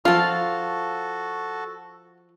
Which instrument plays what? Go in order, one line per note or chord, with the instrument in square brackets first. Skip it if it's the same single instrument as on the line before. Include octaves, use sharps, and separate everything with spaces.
[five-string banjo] F3 F4 [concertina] F#4 A4 [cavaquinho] F5 A5